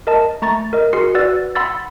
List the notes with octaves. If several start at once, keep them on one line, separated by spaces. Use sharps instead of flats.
A#4 D#5 A5
A3 A#5 C#6 A6
A#4 D#5
F#4 G#4 A#4 C6 C7 C#7
F#4 B4 D5 F#5 E6 A6
F#5 B5 C6 E6 A6